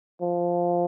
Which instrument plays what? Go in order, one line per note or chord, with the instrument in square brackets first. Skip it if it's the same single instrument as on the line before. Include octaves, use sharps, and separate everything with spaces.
[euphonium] F3